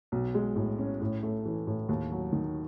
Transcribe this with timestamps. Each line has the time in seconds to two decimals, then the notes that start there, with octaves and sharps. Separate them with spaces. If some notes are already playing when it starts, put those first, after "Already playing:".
0.12 B1
0.35 G#3
0.56 A2
0.78 C#4
1.01 A2
1.23 A3
1.45 E3
1.67 A2
1.89 D#2
2.11 F#3
2.33 D#3